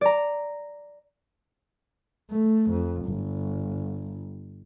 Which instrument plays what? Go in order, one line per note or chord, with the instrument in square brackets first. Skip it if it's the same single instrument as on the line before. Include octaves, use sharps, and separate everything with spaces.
[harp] D5 A#5
[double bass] A3
F2
G1